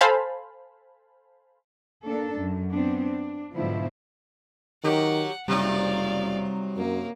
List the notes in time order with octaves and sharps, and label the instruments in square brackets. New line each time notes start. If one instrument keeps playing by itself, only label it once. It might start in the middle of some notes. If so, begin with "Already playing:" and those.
[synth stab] A4 C5 F5 G#5 A5 B5
[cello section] A#3 D4 A4
F#2
B3 C4 D4
D4
G#2 B2 D3 F3 F#3 E4
[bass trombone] D#3 [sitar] F#3 G4 [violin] F#5
[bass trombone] F#1 [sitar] C3 F#3 D#4 [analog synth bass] G3 [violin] D5 F5
[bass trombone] F#2 [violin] A#3